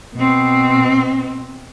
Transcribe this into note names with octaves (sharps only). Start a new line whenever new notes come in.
B2 C4